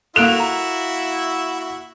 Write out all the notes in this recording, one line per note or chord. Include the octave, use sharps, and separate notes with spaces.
A#3 E4 F#4 A4 E5 F#6 D7 F7
A#5